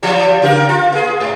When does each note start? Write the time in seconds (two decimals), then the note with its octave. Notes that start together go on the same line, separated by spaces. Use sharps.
0.03 E3 F#3 G3
0.42 C#3 G4 A#4
0.69 F4
0.92 A#3 G#4
1.20 G#2